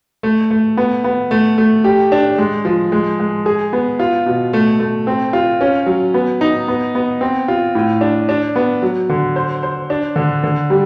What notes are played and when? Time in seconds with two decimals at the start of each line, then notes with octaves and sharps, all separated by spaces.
0.23 A3
0.51 A3
0.77 B3
1.04 B3
1.31 A3
1.58 A3
1.84 G4
2.12 D4
2.38 G#3
2.65 F3
2.92 G#3
3.20 G#3
3.46 G#4
3.73 B3
3.99 F4
4.26 B2
4.53 A3
4.80 A3
5.07 C4
5.33 F4
5.61 C#4
5.86 F#3
6.14 B3
6.41 D#4
6.68 B3
6.95 B3
7.21 C4
7.48 F4
7.75 A2
8.01 D4
8.29 D4
8.56 B3
8.82 F#3
9.10 D3
9.36 C5
9.63 C5
9.90 D4
10.16 D3
10.44 D3
10.70 G3